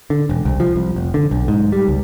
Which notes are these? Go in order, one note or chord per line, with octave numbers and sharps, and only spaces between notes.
D3
E1
C2
F3
C2
F1
D3
B1
G#2
G3
C#2